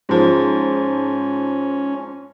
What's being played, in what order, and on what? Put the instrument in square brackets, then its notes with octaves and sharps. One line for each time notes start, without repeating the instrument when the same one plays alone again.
[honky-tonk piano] G#2 F3 [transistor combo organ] C#4